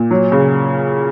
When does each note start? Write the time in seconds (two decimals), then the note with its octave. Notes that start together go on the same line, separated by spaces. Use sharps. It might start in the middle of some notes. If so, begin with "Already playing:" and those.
Already playing: A#2
0.11 F#3
0.32 C#3